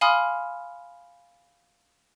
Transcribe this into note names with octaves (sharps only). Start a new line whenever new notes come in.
F5 G#5 B5 C6 D#6 F6